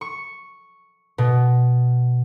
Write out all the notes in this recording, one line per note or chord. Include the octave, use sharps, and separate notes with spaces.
C#6
B2